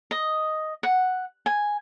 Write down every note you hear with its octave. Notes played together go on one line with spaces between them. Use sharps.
D#5
F#5
G#5